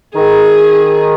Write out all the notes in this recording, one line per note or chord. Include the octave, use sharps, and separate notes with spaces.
D#3 G#4